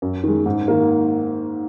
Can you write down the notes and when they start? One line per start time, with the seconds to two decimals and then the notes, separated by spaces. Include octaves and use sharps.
0.02 F#2
0.24 D#3 G#3
0.46 G#2
0.68 D#3 A#3